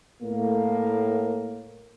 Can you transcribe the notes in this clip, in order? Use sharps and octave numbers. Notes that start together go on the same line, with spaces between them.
A2 A#3